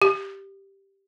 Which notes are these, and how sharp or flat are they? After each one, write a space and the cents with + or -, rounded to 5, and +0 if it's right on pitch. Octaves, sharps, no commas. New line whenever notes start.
G4 -5